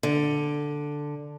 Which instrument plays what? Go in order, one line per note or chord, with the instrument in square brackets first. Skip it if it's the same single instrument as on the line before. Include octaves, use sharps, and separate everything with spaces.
[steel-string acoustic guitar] D3